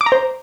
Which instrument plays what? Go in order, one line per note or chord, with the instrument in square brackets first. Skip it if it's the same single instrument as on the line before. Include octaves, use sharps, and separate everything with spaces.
[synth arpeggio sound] D6
A#5
C5